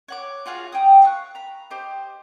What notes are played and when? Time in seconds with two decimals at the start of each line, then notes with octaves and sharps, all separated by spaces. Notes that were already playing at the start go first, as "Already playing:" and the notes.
0.08 C#5 F#5 D6
0.46 F4 F#4 G#4 F5
0.72 G5 G#5 D#6
1.02 F5 C#6 E6 F#6
1.35 A#5 B5
1.70 G4 C5 D#5